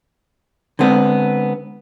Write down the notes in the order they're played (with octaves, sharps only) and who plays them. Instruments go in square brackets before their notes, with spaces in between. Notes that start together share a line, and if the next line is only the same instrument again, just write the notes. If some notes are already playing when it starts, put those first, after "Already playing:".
[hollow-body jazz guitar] D3 G#3 B3 C4